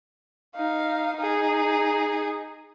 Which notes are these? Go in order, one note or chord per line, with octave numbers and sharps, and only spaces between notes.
D#4 F5
D#4 G#4